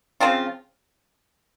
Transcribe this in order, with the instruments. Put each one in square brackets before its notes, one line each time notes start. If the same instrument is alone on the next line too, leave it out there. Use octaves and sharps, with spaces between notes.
[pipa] C#3 F3 C4 F4